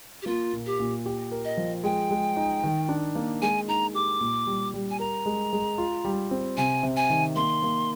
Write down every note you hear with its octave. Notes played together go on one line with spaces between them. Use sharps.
G4
A#3 F4
A#2
G4
A#2
G4
A#4
D#5
F3
G#3 G5
G#3
D#4
D#3
D4
A#3
G#3 G#5
D#4 A#5
G4 D6
A#2
G3
G3
G#5
A#4 A#5
G#3
G#3
F4
G3
C4
C3 G#5
C3
G#5
D#3
A#3 C6
A#3